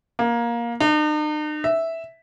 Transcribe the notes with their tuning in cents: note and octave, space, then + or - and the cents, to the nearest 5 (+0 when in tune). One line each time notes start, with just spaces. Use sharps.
A#3 +15
D#4 -45
E5 -5